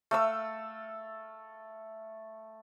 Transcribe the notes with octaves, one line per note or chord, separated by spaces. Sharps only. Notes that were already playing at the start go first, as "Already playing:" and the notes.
A3 F5 E6